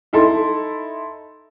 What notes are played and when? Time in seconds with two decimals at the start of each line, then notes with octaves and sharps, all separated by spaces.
0.13 D#4 E4 A4 C6